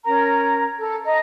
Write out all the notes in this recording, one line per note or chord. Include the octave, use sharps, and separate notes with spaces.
C#4 A#4 A#5
A4
D#5 A#5